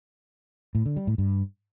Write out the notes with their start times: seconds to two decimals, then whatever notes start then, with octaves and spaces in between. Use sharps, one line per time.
0.75 A2
0.86 D3
0.96 G3
1.07 A2
1.18 G2